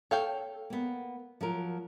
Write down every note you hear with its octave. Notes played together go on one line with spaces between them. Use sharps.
A4 C#5 F5 G5
A#3 B3
F3 F#3 A#4